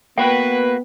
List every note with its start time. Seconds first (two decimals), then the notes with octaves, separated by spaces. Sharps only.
0.18 A#3 B3 F#4 B4 G5